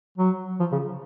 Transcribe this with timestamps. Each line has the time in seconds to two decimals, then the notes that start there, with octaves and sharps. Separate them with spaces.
0.17 F#3
0.60 F3
0.72 C#3